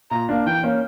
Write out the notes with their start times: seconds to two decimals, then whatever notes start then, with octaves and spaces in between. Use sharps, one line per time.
0.11 A#2 A#5
0.29 A#3 D4
0.46 E3 G5
0.63 A#3 C#4